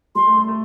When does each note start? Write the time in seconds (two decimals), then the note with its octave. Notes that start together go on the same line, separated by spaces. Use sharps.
0.15 G3 C6
0.27 A3
0.37 A3
0.48 A3